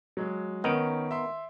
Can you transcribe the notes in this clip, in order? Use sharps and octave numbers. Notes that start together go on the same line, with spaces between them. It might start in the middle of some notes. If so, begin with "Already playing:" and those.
F#3 G#3
D#3 B3 C#4 D#4 A#4 D7
E5 C6